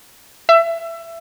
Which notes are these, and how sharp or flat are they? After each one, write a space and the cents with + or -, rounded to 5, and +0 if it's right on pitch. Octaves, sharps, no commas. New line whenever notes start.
E5 +20